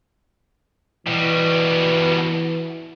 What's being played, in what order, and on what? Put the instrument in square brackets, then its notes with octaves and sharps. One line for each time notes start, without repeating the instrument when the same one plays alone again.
[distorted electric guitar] B2 G3 [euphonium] E3